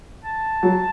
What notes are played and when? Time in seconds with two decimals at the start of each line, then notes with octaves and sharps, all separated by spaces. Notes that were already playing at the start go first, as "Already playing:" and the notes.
0.25 A5
0.63 F#3